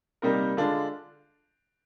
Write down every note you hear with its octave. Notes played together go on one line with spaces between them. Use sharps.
C3 G3 A#3 D#4 A#4
D3 G#3 D4 F4